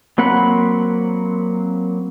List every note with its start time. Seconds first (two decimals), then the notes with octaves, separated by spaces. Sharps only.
0.18 F#3 A#3 C4 F#5 B5